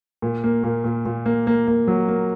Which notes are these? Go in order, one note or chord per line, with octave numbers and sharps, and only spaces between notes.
A#2
A#3
A#2
A#2
A#2
A#3
A#3
A#3
F#3
A#3